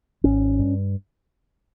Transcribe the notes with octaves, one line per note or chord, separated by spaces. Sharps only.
G#1 C#4
G2